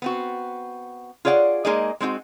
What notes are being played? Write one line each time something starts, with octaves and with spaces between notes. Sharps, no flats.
B3 C4 F#4
F4 G#4 C#5 D5 F5 F#5
G#3 A#3 D#4 G#4 D5 D#5
G#3 C4 D#4 F#4